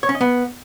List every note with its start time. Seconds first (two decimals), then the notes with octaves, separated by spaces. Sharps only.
0.03 C#5
0.09 C#4
0.15 D#5
0.21 B3